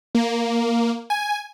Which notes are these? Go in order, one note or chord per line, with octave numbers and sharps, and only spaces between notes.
A#3
G#5